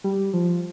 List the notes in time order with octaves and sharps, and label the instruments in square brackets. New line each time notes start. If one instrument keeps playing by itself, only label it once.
[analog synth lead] G3
F3